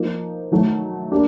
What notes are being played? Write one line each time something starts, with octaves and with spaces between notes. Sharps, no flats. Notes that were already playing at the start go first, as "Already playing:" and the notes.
Already playing: F3 A#3 D#4
D#3 F#3 A3
A#3 D4 G4